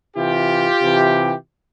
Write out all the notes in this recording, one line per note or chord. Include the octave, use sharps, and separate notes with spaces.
C3 E3 F4 G4
C3 E3